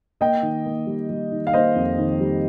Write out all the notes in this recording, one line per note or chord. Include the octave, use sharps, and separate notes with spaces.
A#3 D#5 G5
D#3
A#3
G3
G3
D#3
F5
A#3 C5 D#5
F2
D#3
G3